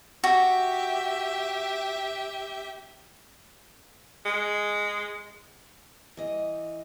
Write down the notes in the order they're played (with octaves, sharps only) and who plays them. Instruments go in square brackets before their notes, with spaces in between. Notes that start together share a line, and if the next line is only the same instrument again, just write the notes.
[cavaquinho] F#4 [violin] G4 E5
[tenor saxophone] G#3
[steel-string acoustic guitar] E3 D#5